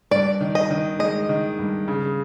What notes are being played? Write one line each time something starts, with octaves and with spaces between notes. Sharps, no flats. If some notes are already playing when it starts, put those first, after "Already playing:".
G2 D5
D#3
D#5
D#3
G#3 D#5
D#3
G2
C#3